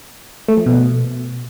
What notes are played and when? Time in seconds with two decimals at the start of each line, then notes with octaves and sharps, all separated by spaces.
0.48 A3
0.57 F3
0.66 B2